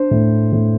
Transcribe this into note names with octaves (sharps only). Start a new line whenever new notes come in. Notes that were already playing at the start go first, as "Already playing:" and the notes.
Already playing: D4 C5
A2
A2